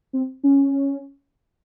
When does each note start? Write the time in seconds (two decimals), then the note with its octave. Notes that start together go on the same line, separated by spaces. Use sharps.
0.13 C4
0.44 C#4